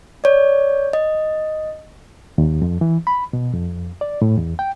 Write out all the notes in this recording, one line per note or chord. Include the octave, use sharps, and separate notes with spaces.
C#5 D5
D#5
D#2
F2
E3
B5
B2
F2
D5
A2
E2
G5